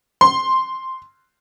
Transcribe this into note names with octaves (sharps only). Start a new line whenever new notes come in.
C6